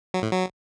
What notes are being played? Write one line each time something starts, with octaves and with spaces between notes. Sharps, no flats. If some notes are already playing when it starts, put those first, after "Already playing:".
F#3
A2
F#3